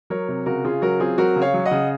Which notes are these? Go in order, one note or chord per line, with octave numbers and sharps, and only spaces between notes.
F#3 A#4 C#5
C3
C#3 F#4 A#4
C#3 F4 G#4
F#3 F#4 A#4
C4 F4 G#4
F#3 F#4 A#4
C#3
C#5 F5
F#3
D#5 F#5
C#3